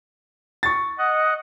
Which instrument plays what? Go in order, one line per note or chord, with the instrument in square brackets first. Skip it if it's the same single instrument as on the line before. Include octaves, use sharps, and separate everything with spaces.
[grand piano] C#6 A6
[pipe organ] D#5 F#5